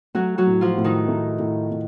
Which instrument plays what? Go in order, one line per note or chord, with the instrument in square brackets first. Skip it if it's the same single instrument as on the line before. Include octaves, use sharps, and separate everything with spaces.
[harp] F#3 F#4 [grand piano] A3
[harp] F#3 F#4
[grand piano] A2
[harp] F3 F4
[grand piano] A2
[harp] D#3 D#4
[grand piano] A3
A2
A2